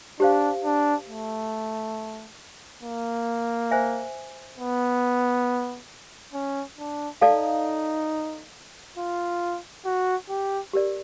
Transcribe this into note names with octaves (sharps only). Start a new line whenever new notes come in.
D4 G4 C5 F5
D4
A3
A#3
C5 E5 G#5
B3
C#4
D4
D#4 A4 D5 F5 A5
F4
F#4
G4
G4 A#4 D5